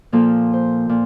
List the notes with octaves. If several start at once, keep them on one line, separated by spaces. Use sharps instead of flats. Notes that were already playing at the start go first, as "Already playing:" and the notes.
A#2 F3 A#3 A4
C5
A#2